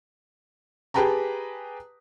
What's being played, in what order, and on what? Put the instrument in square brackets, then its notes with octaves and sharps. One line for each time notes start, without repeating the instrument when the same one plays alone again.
[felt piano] G4 G#4 B4 G5 A5 A#5